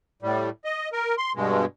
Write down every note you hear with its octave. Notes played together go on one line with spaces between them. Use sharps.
A2 G3
D#5
A#4
C6
G2 B2 G#3